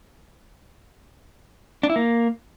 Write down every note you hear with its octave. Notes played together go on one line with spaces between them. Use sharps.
D4
E4
A#3